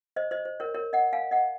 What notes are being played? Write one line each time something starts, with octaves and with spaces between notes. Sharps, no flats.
C5 D#5
C5 D#5
C5
A#4 C#5
A#4 C#5
D#5 F#5
F5 G#5
D#5 F#5